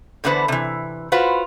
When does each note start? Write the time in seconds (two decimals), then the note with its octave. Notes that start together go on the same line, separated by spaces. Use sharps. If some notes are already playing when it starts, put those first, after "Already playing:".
0.24 E2 D3 B3 B4 C5
0.48 C3 E3
1.12 F4 F#4 B4 C5